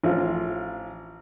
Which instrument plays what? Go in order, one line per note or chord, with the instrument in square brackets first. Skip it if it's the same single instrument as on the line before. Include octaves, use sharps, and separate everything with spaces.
[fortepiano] A1 F3 F4